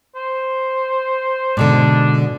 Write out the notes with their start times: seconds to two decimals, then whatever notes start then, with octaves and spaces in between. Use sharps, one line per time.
0.15 C5
1.57 G#2 B2 D3 D4